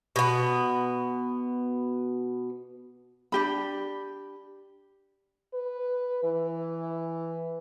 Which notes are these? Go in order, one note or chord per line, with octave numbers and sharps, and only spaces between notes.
B2 B3
D4 G4 B5
B4
E3